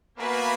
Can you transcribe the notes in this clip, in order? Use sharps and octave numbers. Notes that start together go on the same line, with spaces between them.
A#3 B3 F#4 B4 E5 G#5